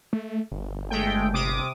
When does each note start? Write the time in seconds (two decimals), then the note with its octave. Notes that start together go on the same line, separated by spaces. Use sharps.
0.13 A3
0.51 G1
0.90 G#3 A3 G5
1.33 C3 D6 D#6